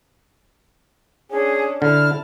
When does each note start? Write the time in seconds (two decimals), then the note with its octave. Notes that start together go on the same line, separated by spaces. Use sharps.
1.31 C#4 D4 G#4
1.82 D3 E4 A5 F6